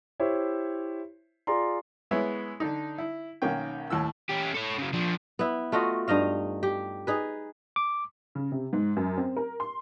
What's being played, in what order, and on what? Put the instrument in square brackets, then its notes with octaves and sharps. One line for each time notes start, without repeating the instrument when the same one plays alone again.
[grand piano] E4 G4 C5 C#5 E5
F4 G#4 D5 A#5 C6
[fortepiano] G#3 B3 E4 C#5 E5
D3 D4 D#4
E4
B1 D#3 A#3 C#4 G5
D#2 A2 E6
[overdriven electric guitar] C#4 G4
A4 C#5
C#3 F#3
F3 D4
[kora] B3 E4
A3 F4 F#4 D#5
G2 D#4 D#5 F5
G4
D#4 G#4 B4
[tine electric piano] D6
[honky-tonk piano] C#3
C3
G#2
F#2
C4
A#4
C6